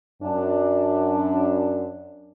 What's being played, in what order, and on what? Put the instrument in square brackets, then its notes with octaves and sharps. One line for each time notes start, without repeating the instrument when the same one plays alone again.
[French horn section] F#2 D4